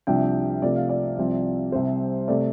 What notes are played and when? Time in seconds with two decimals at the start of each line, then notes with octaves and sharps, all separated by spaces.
0.07 C2 C3 F3 D4 G5
0.62 C3 F3 A3 D5
0.76 F5
0.89 D5
1.18 C2 C3 F3 C4
1.72 C2 C3 G3 C4 C5
2.28 C3 A3 D5